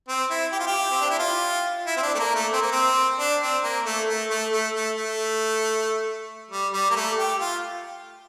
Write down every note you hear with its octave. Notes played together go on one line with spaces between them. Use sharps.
C4
E4
G4
F4
G4
C4
D4
E4
F4
E4
C4
D4
A3
A#3
A3
C4
A#3
C4
D4
C4
A#3
A3
A3
A3
A3
A3
A3
G3
G3
A#3
A3
G4
F4